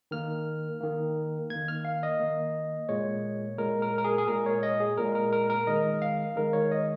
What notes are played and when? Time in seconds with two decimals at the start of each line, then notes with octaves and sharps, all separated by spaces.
0.11 D#3 A#3 F6
0.81 D#3 A#3
1.50 D#3 A#3 G#6
1.68 F6
1.85 F5
2.03 D#5
2.20 D#3 A#3
2.89 A#2 G#3 C#5
3.58 A#2 G#3 A#4
3.82 A#4
3.98 A#4
4.04 G#4
4.18 G#4
4.28 A#2 G#3 A#4
4.46 C#5
4.63 D#5
4.80 G#4
4.98 A#2 G#3 A#4
5.15 A#4
5.33 A#4
5.50 A#4
5.67 D#3 G#3 D#5
6.02 F5
6.36 D#3 G#3 A#4
6.53 C#5
6.72 D#5